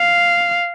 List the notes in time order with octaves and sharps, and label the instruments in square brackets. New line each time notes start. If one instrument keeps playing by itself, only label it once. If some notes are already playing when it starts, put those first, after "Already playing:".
Already playing: [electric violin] F5